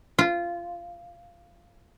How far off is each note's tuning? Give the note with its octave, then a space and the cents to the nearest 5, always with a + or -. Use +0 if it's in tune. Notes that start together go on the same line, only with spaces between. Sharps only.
F4 -15